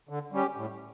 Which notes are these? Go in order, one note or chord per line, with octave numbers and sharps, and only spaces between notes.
D3
G3 C#4 G4
A2